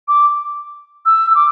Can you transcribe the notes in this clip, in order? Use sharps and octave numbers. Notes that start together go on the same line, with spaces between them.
D6
E6
E6
D6